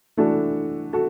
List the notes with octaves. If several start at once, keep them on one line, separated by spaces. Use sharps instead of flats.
E3 A3 D4 F#4 A4
F#4 A4